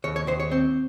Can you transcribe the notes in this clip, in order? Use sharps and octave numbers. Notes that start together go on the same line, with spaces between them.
D#2 C#5
C#5
D#2 C5
C#5
C4